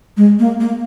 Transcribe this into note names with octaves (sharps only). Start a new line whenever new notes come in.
G#3
A#3
A#3